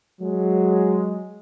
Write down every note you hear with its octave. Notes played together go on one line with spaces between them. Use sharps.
F#3 G#3